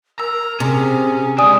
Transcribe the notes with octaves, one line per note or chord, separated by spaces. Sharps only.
A#4 A#5 E6
C3 C#4 G#4
D3 G#3 D5 G#5 D#6